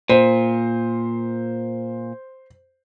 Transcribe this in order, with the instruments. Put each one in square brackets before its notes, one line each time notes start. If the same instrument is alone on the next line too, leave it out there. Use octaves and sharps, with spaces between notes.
[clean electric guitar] A#2 [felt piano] C5